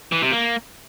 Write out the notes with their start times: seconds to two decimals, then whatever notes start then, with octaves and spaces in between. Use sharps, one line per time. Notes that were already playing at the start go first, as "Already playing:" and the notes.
0.12 E3
0.22 C3
0.32 A#3